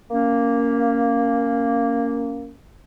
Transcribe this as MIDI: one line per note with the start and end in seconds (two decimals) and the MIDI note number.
0.11 2.53 58
0.11 2.53 61